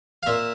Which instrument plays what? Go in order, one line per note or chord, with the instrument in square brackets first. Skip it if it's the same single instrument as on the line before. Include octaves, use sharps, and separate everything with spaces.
[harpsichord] F5
A#2 E5